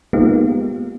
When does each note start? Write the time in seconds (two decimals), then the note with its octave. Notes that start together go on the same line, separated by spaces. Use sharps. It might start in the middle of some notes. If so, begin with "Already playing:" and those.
0.13 G#3 A#3 B3 D#4 F4 G4